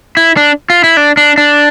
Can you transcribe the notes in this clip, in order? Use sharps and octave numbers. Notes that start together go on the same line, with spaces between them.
E4
D4
F4
E4
D4
D4
D4